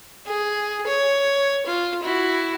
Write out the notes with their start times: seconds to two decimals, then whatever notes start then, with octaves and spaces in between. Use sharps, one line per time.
0.26 G#4
0.87 C#5
1.66 F4
2.03 E4 F#4